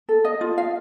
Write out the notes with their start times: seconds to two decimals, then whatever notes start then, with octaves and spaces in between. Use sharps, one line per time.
0.09 A4
0.25 D#5
0.41 F4
0.58 F5